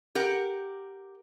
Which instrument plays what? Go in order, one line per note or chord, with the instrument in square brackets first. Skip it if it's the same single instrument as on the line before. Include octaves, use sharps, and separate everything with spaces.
[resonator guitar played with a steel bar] G4 A#4 F#5